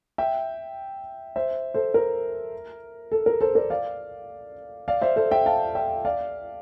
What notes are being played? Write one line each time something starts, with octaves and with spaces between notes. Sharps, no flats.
E5 G5
C5 E5
A4 C5
A#4
A4
A#4
A4 C5
A#4 D5
D5 F5
D5 F5
C5 E5
A4 C5
E5 G5
F5 A5
E5 G5
D5 F5